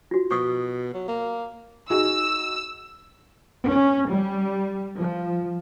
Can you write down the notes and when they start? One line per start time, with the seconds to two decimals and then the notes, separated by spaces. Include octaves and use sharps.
0.11 F4 F#4
0.31 B2 C#6 D#6
0.94 F#3
1.08 A#3
1.90 D#4 F#4 G#4 E6
3.66 C#4
4.10 G3
4.97 F3